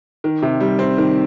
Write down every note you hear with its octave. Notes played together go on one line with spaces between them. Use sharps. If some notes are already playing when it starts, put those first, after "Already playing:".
D#3
C3
G3
C4
D#3